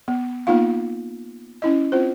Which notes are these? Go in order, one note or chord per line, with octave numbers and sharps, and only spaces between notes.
B3
A#3 B3 D#4 F4 F5
C#4 E4 D#5
C4 F4 C5